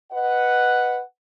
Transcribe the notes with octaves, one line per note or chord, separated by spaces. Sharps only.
B4 D#5 F#5